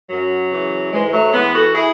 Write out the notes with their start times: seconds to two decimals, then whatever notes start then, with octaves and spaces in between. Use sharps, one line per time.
0.09 F#2 F#3
0.50 C#3 E3
0.91 G#2 E3 G#3
1.06 G#3
1.12 F#3 A3
1.33 E3 G#3 B3
1.54 F#4 A4
1.75 E4 G#4